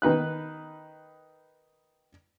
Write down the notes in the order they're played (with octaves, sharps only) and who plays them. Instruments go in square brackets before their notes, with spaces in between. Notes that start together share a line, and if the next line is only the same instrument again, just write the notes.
[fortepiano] D#3 D#4 B4 F#6